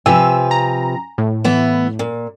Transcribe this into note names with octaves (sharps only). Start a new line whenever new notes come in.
C3 F3 B4 G#5 E6
A#5
A2
E3 B3 E5
A#2